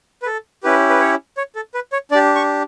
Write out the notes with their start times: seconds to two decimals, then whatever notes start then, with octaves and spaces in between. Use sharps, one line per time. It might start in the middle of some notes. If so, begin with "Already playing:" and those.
0.22 B4
0.26 A4
0.63 C#4 E4 G4 B4
0.89 B4
1.00 C#5
1.37 C#5
1.55 A4
1.74 B4
1.92 C#5
2.11 D4 D5
2.15 G4
2.35 C#6